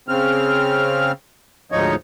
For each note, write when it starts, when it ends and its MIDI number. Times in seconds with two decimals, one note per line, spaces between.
0.08 1.12 49
0.08 1.12 60
0.08 1.12 89
1.72 1.95 38
1.72 1.95 44
1.72 1.95 53
1.72 1.95 63
1.72 1.95 73